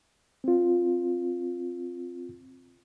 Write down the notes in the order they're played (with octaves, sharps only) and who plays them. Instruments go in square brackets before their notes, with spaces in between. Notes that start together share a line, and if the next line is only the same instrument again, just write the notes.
[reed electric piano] C4 F4